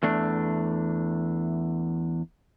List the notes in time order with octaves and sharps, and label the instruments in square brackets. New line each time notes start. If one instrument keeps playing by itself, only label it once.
[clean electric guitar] E2 A3 D4